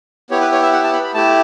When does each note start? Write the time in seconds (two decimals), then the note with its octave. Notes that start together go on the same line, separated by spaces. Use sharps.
0.30 B3 E4 G4 C#5
0.41 B4
0.52 C#5
0.62 E5
0.73 F#5
0.84 A5
0.94 B5
1.04 B5
1.14 A3 E4 G4 A5